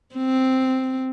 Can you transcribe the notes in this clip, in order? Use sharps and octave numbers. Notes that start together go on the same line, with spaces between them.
C4